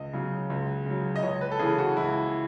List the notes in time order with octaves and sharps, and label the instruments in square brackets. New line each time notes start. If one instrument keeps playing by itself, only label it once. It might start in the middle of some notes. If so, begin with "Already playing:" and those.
Already playing: [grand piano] C#2 D#5
C#3 F#3
C#2
C#3 F#3
D#5
C#2 C#5
B4
A4
C#3 E3 G#4
F#4
C#2 E4